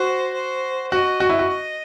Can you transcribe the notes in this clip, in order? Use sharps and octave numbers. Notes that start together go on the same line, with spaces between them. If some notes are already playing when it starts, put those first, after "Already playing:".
Already playing: F#4 C5
C5
F#4 D#5
F#4
E4
F#4
D#5